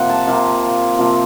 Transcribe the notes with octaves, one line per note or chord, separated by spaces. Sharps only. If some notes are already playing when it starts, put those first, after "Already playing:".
Already playing: C3 F3 A#3 F4 F#5
A5
C3 F3 A#3 F4
C3 F3 A#3 F4